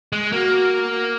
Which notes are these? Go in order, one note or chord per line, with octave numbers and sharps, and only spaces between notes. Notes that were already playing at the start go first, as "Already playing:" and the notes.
G#3
A#3 F#4